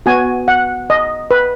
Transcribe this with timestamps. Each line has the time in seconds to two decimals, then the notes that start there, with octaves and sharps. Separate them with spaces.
0.06 B3 F#4 G#5
0.48 F#5
0.90 D#5
1.31 B4